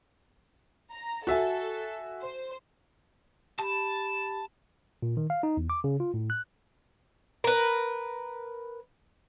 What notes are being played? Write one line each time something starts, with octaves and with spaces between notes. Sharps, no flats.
A#5
F#4 A4 E5 G#5
C5
G4 A5 B5
A#2
D#3
F5
D#4
E2
D6
C#3
F4
A2
F#6
A#4 B4